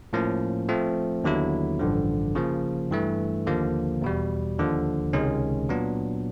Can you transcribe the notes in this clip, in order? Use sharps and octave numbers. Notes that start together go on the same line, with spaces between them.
A2 F3 A#3 C#4
F3 A3 C4
D#2 D3 F#3 B3 E4
A1 G2 D3 F3
C#3 F3 A#3
G2 E3 A3
D#2 D3 F3 A#3
E2 B2 G3
D#2 D3 F3
C#2 C3 D#3 G#3 C#4
A#2 F#3 B3 D4